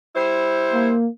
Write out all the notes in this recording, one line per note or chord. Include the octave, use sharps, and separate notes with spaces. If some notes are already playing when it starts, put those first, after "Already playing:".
G3 E4 C5
A#3